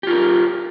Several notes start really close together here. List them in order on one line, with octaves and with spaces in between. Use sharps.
G4 F4 A#4